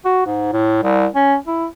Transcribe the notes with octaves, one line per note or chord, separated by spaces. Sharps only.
F#4
G#2
A2
C2
C#4
E4